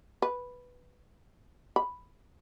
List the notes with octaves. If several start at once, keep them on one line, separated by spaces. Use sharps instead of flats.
B4
B5